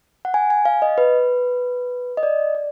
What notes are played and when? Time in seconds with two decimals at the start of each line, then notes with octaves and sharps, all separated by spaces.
0.25 F#5
0.34 G#5
0.50 G#5
0.65 F5
0.82 D#5
0.98 B4
2.17 D#5
2.23 D5
2.55 D5